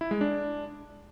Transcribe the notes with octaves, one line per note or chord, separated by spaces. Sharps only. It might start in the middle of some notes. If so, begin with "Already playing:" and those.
E4
G#3
D4